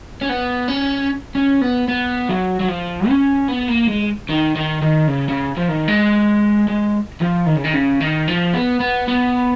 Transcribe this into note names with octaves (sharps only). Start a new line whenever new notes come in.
C#4
B3
C#4
C#4
B3
B3
F#3
F#3
F3
C#4
B3
A#3
G#3
D#3
D#3
D#3
C#3
C#3
F3
D#3
G#3
G#3
F3
D#3
C#3
D#3
C#3
D#3
F3
B3
B3
B3